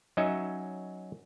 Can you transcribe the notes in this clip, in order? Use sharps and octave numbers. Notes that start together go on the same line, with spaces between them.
F#3 C#4 D#4 D#5 E5